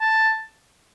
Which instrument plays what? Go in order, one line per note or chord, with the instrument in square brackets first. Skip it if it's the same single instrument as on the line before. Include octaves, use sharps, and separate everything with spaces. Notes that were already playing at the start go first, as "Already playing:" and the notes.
[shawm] A5